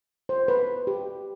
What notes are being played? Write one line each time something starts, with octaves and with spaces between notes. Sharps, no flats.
C5
B4
G4